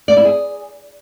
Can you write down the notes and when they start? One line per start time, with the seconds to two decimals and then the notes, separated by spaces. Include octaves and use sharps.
0.08 D5
0.17 E4
0.25 G#4